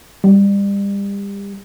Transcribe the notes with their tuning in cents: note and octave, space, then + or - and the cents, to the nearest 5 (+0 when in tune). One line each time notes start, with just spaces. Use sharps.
G3 +30